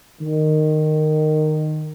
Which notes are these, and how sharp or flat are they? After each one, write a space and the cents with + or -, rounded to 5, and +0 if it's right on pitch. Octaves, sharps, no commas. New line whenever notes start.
D#3 -15